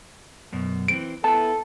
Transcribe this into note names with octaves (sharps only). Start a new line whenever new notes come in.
F#2 B2
E3 C4 D7
B3 E4 A4 A5